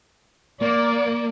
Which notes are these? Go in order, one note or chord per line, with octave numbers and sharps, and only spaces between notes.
A#3 D5